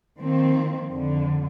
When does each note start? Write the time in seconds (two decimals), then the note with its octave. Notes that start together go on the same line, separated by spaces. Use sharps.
0.19 D#3 F3 A#3 C4
0.89 F2 D3